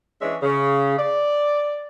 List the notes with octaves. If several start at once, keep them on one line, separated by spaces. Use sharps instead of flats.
E3 G#3 C#4 D4 C#5 E5
C#3
D5